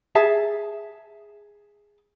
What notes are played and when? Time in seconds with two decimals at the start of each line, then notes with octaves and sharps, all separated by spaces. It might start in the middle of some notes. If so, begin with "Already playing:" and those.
0.15 G#4 E5 A5